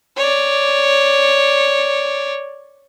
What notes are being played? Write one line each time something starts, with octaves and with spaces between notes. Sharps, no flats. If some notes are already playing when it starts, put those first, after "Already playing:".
C#5 D5